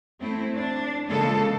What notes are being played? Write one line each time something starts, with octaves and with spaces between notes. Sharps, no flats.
A3 C4 E4
D4
C#3 E3 G#3 A#3 F4 A4